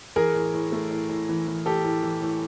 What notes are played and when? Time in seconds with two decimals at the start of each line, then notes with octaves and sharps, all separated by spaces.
0.16 E3 G#4 A#4
0.35 A2
0.54 A2
0.72 A3
0.91 A2
1.10 A2
1.29 E3
1.47 E3
1.66 A2 G4 A4
1.84 A2
2.03 E3
2.22 A2